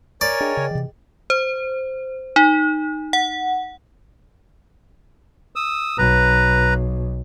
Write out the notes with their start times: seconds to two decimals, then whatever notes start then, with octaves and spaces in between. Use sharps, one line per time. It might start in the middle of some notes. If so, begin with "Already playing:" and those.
0.21 A#4 C#5 D5 G#5 A#5 A6
0.40 D4 G#4 D#5 G5
0.57 C#3
0.71 C3 E3
1.30 C5
2.36 D#4
3.13 F#5
5.56 D#6 E6
5.98 B1 B4 A#5